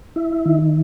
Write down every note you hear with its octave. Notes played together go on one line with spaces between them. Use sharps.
E4
D#3